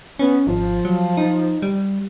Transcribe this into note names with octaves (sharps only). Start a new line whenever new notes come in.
B3 C#4
G#1 F3
F#3
D#4
G3